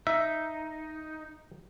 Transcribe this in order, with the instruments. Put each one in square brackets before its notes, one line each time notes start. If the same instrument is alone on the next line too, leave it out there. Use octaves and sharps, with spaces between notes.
[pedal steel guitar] D#4 [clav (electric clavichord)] E5